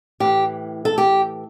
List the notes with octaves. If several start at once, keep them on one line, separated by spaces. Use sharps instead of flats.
A2 E3 G4
A4
G4